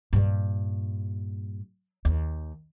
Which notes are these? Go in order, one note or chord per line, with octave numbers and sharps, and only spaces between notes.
G2 A#2
D#2